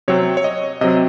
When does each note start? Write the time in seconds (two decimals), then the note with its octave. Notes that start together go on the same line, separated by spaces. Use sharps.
0.08 C3 F#3 C4 C#5
0.37 C#5
0.44 D#5
0.81 C3 F#3 C4 D#5